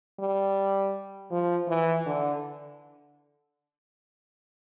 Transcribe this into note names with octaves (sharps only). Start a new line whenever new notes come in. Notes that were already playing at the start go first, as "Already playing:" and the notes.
G3
F3
E3
D3